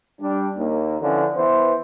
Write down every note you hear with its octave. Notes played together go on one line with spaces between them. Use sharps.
G3 D4
D#2 A#3
D3 E3 F3 C#4 D4
E3 B3 C5